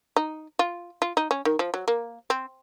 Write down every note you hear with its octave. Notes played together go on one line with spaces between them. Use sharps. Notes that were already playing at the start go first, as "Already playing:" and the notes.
D#4
F4
F4
D#4
C#4
D#3
F3
F#3
A#3
C4